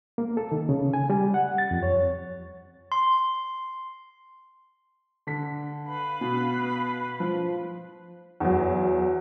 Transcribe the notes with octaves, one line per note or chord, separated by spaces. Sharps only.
A#3
A4
D#3
C#3
G#5
G3
F#5
A6
F2
C#5
C6
D3 D4 B6
B4 F5 B5
B2
F3
E2 F#3